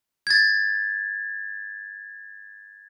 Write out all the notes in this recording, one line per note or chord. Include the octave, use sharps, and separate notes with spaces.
G#6 A6